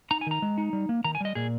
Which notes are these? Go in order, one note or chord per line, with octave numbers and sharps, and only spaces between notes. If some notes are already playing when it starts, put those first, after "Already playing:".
D#4 A#5
G#5
D#3 A#5
G#3
D#4
G3
A#3
D#3 A#5
G#5
G3 D#5
A#2 G#4